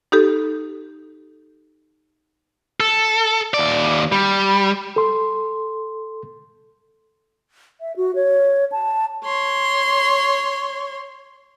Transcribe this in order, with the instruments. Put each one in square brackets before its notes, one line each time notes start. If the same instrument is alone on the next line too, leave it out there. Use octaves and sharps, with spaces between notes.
[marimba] D#4 G4 A4
[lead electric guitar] A4
D#2 D5
G3
[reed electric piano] A4 C6
[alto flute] E5
F#4
C#5
A5
[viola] C#5 C6